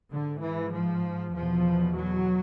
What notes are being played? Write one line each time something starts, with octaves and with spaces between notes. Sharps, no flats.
G#2 D3
E3
F3
E2 B2 F3
F#3